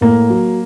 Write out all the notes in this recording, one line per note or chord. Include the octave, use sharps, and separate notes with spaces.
A2 A#3
F#3